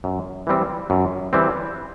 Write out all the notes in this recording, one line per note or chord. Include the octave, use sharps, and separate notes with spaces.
F#2
E3 G3 C4
F#2
E3 G3 C4